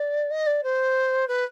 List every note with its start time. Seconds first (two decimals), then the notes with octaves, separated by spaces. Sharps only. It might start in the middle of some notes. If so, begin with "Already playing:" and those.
Already playing: D5
0.30 D#5
0.46 D5
0.63 C5
1.27 B4